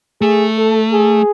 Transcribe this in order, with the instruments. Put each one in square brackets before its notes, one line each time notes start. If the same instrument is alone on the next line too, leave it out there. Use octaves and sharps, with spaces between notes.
[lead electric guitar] A3 [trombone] G#4
[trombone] A4
G#4